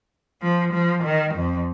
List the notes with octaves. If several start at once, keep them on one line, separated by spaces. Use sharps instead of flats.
F3
F3
D#3
F2